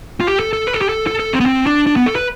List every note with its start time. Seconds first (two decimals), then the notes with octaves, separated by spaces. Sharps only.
0.20 F4
0.27 G4
0.40 A4
0.53 A4
0.67 B4
0.73 A4
0.82 G4
0.89 A4
1.07 A4
1.20 A4
1.33 C4
1.40 B3
1.46 C4
1.66 D4
1.86 D4
1.96 B3
2.06 A4
2.16 B4